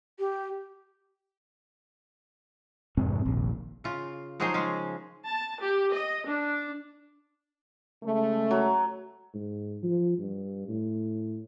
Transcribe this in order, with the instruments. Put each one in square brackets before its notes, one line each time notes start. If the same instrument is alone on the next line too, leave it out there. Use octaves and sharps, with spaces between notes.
[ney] G4
[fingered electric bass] F2 G#2 C3 C4
F1 A#1 D#2
[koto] C#3 F4
F3 F#3 D#4 G#4 A#4 C5
C#3 G#3 C#4
[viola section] A5
G4
D#5
D4
[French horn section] C#3 G#3 A3
[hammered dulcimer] F#3
[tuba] G#2
F3
G2
A2